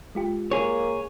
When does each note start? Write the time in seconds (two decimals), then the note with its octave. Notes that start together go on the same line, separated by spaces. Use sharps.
0.15 G#3 F4 G4
0.51 A#3 G#4 C#5